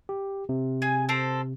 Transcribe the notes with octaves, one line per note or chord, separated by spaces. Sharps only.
G4
C3
G#4 G#5
A4 A#4 C5